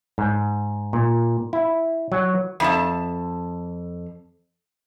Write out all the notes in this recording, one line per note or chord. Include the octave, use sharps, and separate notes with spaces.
G#2
A#2
E4
F#3
F2 E4 A5